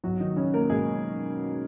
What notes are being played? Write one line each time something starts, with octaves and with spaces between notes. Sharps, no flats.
B1 B2 F#3 F#4
D#3 D#4
C#3 C#4
A#3 A#4
B2 G#3 G#4